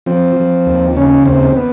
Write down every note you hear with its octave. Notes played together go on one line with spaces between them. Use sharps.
F3 C4
F3
D#2
C#3 C#4
D#2 C4
B3